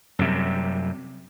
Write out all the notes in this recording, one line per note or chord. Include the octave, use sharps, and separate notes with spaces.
F#2 C3 G3